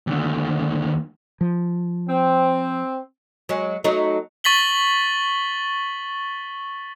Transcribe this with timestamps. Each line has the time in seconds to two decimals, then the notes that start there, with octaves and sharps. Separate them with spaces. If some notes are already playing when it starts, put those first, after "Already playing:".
0.07 D#2 D3
1.41 F3
2.09 C4
3.49 F#3 G#3
3.84 F#3 A3 D#4
4.44 C#6 A6 B6 F#7 G7